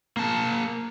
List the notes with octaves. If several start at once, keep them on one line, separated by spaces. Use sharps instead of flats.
A#3 A5